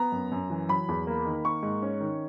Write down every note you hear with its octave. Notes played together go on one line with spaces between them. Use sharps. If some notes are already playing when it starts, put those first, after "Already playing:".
Already playing: B3 A#5
F#2
F#2
E3
F#3 B5
E2
A#3
D#3
A#3 C#6
G#2
C#4
D#3